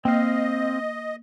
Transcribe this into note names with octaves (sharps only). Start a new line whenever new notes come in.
A#3 C4 D#5 F5